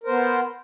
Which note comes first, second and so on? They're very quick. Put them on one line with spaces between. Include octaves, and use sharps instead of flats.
A#4 C5 B3